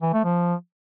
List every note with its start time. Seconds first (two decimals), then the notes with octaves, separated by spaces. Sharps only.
0.02 E3
0.13 A3
0.25 F3